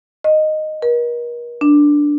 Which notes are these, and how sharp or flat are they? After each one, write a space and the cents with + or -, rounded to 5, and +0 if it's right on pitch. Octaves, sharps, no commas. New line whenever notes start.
D#5 -5
A#4 +45
D4 +0